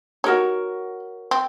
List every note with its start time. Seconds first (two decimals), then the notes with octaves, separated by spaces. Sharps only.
0.24 D#4 F#4 A#4 C#5
1.31 C4